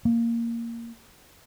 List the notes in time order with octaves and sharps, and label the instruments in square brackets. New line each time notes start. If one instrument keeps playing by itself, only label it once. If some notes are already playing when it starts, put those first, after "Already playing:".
[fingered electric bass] A#3